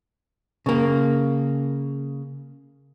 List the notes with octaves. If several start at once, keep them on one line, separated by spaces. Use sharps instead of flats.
C#3 A#3